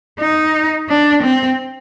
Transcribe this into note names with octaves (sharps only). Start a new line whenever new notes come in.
D#4
D4
C4